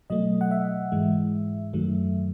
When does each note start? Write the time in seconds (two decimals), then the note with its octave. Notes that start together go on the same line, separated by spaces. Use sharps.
0.10 B2 F#3 A3 D#5
0.41 F#5
0.51 E5
0.92 G#2 E3 G#3
1.73 F#2 D#3 F#3 A3